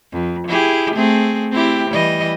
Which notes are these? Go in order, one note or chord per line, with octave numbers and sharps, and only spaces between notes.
F2
E4 G4 G#4
A3 C4 G#4
C4 E4 G4
E3 G3 D#5